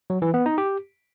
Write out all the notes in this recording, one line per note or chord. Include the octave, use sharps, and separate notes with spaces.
F#3
E3
B3
D#4
G4